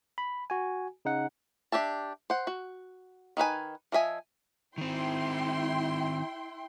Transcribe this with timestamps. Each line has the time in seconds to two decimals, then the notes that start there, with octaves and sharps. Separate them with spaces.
0.18 B5
0.50 F#4 G#5
1.05 C#3 D#4 F#5
1.72 D4 G4 E5 A5
2.30 C5 F#5
2.47 F#4
3.37 D#3 D#4 B4 G#5
3.92 F3 D#5 E5 G#5
4.78 D#3 C4 E4 G5 C6